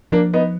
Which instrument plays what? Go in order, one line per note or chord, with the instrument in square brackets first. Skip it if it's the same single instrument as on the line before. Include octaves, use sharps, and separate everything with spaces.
[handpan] F3 [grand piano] A#3 D4
[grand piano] B3 D#4